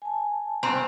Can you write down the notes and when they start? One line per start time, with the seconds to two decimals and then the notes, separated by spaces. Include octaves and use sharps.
0.02 G#5 A5
0.63 G2 C4 A#5